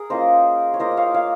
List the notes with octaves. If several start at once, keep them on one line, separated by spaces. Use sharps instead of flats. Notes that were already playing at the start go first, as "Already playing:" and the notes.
Already playing: G#4 A#4
A#3 C#4 F4 C5 D#5
C#5
A#3 F4 C5 D#5
D#5
C#5 F5
C#5 F5